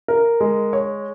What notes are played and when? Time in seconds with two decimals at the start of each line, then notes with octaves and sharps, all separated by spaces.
0.08 A#4
0.40 G#3
0.73 C#5